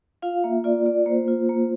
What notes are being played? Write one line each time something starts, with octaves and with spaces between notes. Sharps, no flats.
F4 F5
A#3 E5
F4 D5
F4 D5
A#3 C5
F4
A#3